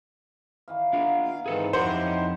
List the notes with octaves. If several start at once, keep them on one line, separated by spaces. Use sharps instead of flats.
D#3 E3 F5
A#3 B3 D4 F4
F5
G#2 C3 D#3 E3 G#4 A4 B4
F2 D#4 E4 G4 C5 C#5 F#5